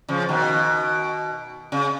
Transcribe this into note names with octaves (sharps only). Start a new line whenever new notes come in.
C#3 F3
B2 D#3
C#3